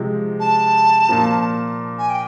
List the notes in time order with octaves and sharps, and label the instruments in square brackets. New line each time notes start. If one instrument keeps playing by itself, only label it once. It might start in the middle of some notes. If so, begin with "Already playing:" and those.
Already playing: [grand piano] C3 F3 G#3
[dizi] A5
[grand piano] A#2 F3 A#3
[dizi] G#5
G5